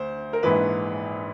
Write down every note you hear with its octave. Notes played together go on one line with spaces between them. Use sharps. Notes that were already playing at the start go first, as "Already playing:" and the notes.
Already playing: D2 C5
A#4
A#1 G#2 E3 B4